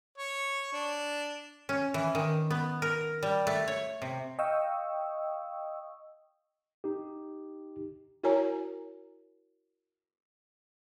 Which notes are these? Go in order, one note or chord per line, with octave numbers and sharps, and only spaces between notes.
C#5
D4
C#4
E3
D#3
B3
A#4
G3
A3
C#5
C3
D#5 F5 G5 C#6 D#6 E6
D#4 G4
E4 F#4 A#4 C#5 G#5 A#5